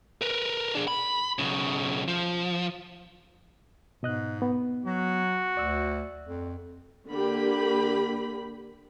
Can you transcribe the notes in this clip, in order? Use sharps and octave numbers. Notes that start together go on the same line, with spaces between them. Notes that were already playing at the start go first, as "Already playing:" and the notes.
A#4 B4
D4 G#4
B5
B1 C#3
F3
G#2 B2 D#5 F#6
B3
F#3 F#4
D2 D5 E6
F2
D3 A#3 G4 B5